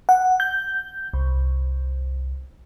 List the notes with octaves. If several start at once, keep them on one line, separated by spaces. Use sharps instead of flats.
F#5
G6
C2